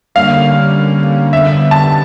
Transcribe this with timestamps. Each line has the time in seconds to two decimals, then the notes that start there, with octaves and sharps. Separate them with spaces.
0.15 D3 G3 A#3 C#4 F5
1.33 D3 G3 B3 E5
1.71 A5